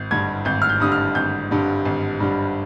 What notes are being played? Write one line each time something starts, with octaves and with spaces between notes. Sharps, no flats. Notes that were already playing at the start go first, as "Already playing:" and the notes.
Already playing: G#1 G6
G2 D3 G3 G#6
G#1 G6
F6
G6
G2 D3 G3 D#6
F6
G#1 G6
G2 D3 G3
G#1
G2 D3 G3